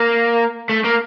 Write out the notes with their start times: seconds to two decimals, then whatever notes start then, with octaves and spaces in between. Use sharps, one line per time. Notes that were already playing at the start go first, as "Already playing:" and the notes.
Already playing: A#3
0.69 A3
0.84 A#3